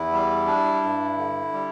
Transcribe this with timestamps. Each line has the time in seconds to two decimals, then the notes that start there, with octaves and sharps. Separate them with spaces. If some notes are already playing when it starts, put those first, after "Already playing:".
Already playing: E2 E4
0.13 G3
0.47 D4
0.83 G2
1.18 D3
1.53 G3